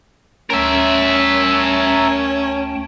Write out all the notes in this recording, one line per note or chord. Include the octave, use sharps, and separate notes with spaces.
D2 C#4 A#4 E5 G5 A5